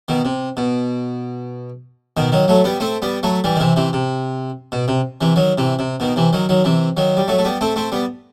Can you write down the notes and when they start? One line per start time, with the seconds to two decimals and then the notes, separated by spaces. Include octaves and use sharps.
0.08 B2 D#3
0.25 C3
0.57 B2
2.17 B2 D#3
2.32 D#3 F#3
2.48 F#3 A3
2.64 G3 B3
2.80 A3 C4
3.02 G3 B3
3.23 F#3 A3
3.44 E3 G3
3.56 D#3
3.60 C3 E3
3.76 C3 E3
3.93 C3
4.72 B2
4.88 C3
5.21 C3 E3
5.36 D#3 F#3
5.58 C3 E3
5.79 C3
6.00 B2 D#3
6.16 C3 E3
6.33 D#3 F#3
6.49 D#3 F#3
6.64 C3 E3
6.97 D#3 F#3
7.17 G3
7.28 F#3 A3
7.38 A3
7.45 G3 B3
7.61 A3 C4
7.76 A3 C4
7.92 G3 B3